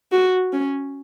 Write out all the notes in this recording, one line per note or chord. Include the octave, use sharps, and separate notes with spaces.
F#4
C#4